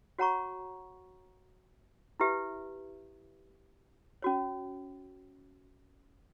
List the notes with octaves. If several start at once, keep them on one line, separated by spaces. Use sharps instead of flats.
F#4 C#5 F#5 A#5 C#6
E4 G4 B4 E5
C#4 F#4 C#5